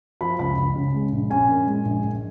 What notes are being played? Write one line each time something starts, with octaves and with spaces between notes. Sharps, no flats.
F3 B5
C#2 B5
C#2
C#3
G#3
A#1
C#4 G#5
A#2
G#3
A#1
A#1